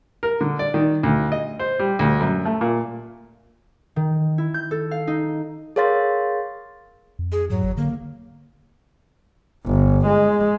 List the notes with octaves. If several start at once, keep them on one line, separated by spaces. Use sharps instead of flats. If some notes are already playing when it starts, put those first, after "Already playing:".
A#4
D3
D5
D#3
D2
D#5
C5
G3
D2
F#2
A3
A#2
D#3
E4
G6
A4
F5
D#4
G#4 A#4 C#5 F5 C6 A6
F2
G#4
G#2 F#3
G#1
D3 A#3
G1
G#3